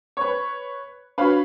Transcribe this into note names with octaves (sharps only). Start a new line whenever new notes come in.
B4 C#5
D4 F#4 B4 C#5 F5